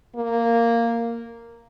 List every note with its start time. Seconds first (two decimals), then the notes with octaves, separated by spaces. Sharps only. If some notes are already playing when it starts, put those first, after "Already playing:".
0.16 A#3